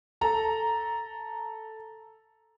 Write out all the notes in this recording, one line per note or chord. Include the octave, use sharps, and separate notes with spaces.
A4 A#5